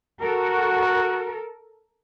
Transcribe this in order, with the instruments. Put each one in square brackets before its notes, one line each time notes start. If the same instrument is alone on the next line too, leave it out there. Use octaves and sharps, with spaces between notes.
[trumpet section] F#4 [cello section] A4 A#4